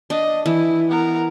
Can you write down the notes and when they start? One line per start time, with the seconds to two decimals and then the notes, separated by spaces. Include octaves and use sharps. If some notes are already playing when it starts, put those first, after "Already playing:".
0.10 D4 D#5
0.46 E3 E4
0.90 B3 A#4